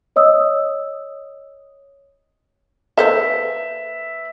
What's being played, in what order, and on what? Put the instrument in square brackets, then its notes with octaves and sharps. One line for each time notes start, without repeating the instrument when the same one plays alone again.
[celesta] C#5 D#5 D#6 E6
[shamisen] A#3 A4 C5 [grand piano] B4 E5